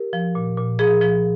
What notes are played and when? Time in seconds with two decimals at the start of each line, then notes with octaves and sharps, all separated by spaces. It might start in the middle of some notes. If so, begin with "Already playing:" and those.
Already playing: G4 A#4
0.13 F3
0.35 A#2
0.57 A#2
0.79 F3 G#4
1.01 F3